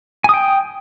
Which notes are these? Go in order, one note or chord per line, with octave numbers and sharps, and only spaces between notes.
G5 G#5 D#6